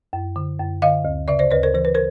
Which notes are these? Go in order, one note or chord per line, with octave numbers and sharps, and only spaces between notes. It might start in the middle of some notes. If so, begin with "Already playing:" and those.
F#2
D3
F#2
D3 D#5 F5
D2
C#3 D5 E5
C5 D5
D2 B4 C#5
A#4 C5
E3 C5
B4
A#4 C5